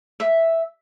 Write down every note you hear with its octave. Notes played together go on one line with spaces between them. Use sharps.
E5